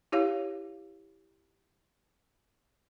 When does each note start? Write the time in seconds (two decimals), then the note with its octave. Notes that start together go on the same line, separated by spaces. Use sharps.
0.12 E4 G4 C#5 F5